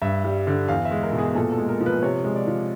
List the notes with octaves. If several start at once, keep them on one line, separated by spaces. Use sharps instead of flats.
G2 E5
G3
D3
E2 F5
E5
G#3
A#4
B2
G#4
A#2 A4
A4
G#3
A#4
F3
B4
C3 C#5
G#3
D5
F3